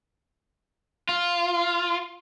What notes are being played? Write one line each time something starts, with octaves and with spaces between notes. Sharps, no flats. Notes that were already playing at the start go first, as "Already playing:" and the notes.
F4